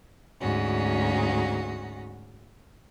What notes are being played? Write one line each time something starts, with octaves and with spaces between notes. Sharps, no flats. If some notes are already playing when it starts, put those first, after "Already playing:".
D2 G#2 C#4 F#4